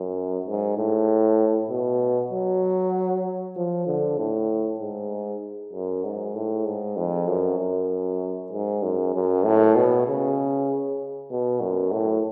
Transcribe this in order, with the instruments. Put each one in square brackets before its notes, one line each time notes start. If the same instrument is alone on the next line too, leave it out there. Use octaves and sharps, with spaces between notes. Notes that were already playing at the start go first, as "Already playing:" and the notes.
Already playing: [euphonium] F#2
G#2
A2
B2
F#3
F3
D3
A2
G#2
F#2
G#2
A2
G#2
F2
F#2
F#2
G#2
F#2
F#2
A2
B2
C#3
B2
F#2
A2